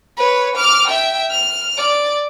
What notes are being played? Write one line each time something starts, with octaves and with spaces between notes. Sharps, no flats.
B4 C#5
D6 F6
E5 G5
F6
D5